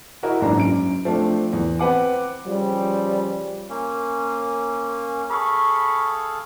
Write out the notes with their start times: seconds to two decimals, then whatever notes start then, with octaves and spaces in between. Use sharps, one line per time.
0.23 E4 F#4 A#4 D#5
0.41 F#1 G#2 E3 D4 A#5
0.56 F#2 D7
1.05 F3 A3 C4 D4
1.53 E2
1.79 C4 B4 F#5 D6
2.46 C#3 F3 G3
3.69 A#3 C#4
5.30 G#4 A4 F5 B5 C#6